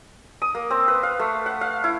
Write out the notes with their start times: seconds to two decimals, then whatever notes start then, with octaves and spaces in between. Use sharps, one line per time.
0.42 D#6
0.55 A#3
0.70 C4
0.88 B4
1.03 F5
1.20 A3
1.46 F#5
1.61 F5
1.84 E4